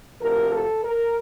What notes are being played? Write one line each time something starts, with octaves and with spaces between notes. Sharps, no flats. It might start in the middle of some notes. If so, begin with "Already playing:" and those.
D2 C3 F3 A#4
A4
A#4